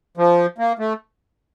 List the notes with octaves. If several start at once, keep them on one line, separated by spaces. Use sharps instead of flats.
F3
A#3
A3